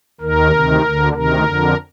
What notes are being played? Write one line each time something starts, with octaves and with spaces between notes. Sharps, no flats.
D#2 D#3 A#4
D2 C3 D#3
D2 D3
D2 C3 D#3 A#4
F2 D3